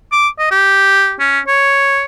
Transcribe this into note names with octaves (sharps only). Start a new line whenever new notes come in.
D6
D#5
G4
C#4
C#5